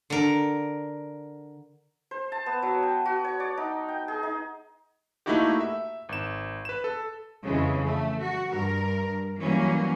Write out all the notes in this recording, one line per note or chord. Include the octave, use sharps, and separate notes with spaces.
D3 A#4
C5
A5
B3
F#3
G5
F#4
C#5
D5
D#4
G5
G#4
D#4
A3 A#3 D#4 E4 F#4 G4
E5
G#1 E7
B4 E7
A4
F2 C#3 E3 G#3
A3
F#4
G2 A#4
E3 F#3 G3 A#3 C#4